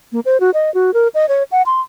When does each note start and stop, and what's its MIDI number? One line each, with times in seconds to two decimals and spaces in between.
0.12 0.20 58
0.25 0.40 72
0.40 0.51 66
0.54 0.73 75
0.74 0.93 66
0.94 1.08 70
1.15 1.26 75
1.29 1.43 73
1.52 1.62 78
1.66 1.80 84